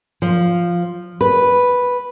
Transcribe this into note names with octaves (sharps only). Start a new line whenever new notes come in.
F3
B4